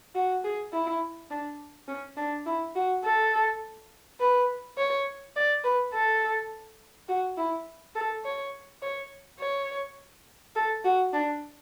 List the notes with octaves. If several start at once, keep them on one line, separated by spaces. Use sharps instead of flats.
F#4
G#4
E4
D4
C#4
D4
E4
F#4
A4
B4
C#5
D5
B4
A4
F#4
E4
A4
C#5
C#5
C#5
A4
F#4
D4